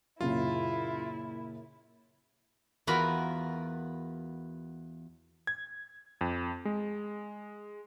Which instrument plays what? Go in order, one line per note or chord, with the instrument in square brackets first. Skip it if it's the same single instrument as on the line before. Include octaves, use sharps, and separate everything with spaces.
[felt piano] F#2 A#2 C#3 [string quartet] E4 [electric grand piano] F4
[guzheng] E2 F4 F#4 A#4 B4 B5
[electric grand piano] G#6
F2
G#3